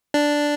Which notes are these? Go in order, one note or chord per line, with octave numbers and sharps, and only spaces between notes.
D4